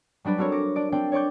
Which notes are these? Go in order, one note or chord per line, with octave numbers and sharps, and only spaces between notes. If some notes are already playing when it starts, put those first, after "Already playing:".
F#3 G3 D4 B4 D5
C4 F#4 A4 A#4 C#5
D6 A#6 C#7
D4 D5 D7
C4 D4 D5 G5
C#5 D5 C#6 D6 G6